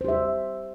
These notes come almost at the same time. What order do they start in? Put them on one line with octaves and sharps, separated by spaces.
C5 G4 E5